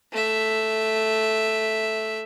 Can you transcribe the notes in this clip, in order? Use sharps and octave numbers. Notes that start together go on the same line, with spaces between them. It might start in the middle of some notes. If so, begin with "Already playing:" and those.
A3 E5